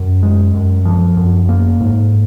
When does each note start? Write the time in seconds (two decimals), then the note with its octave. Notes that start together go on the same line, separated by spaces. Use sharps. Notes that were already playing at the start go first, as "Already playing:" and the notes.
Already playing: F#2
0.23 G#3
0.54 F#2
0.85 F3
1.17 F#2
1.49 A#3
1.80 G#2